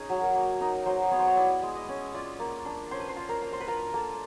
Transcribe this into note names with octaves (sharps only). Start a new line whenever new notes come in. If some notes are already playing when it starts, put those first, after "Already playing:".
Already playing: C#4 D#4 G#4
F#3
A#4
A#3
D#4 A#4
F#3 C5
B3 C#5
C5
C#5
E4 D5
G#3
D#5
C#4
F4 D5
A#3
D4
C#4 C5
B4
C5
F4
A#4
A#3
C5
B4
F4 A#4
A#3 A4